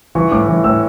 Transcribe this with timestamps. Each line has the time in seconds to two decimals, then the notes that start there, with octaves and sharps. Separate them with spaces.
0.15 E3 C#6
0.32 A2 D6
0.48 E3
0.64 A2 E6